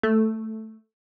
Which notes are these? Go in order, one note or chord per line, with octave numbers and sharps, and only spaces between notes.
A3